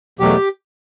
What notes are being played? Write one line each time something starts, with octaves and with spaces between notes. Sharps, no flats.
E2 B2 F#3 A3 G4